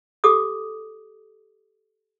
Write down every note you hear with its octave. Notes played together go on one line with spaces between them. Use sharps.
G4 A4 D6 D#6